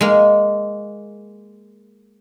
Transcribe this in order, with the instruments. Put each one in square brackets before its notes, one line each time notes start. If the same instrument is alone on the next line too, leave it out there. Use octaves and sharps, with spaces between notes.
[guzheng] G#3 A#3